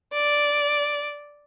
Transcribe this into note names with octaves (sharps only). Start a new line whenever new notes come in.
D5